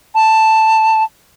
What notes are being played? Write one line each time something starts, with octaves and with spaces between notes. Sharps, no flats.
A5